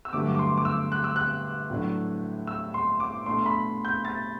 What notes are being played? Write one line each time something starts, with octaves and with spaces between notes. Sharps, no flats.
E6
G2 D3 F#3 A3 D6
D6
C6
D6
E6
F#6
E6
F#6
A2 F#3 A3 D4
E6
C6
D6
B2 A3 D4 C6
B5
G6
A6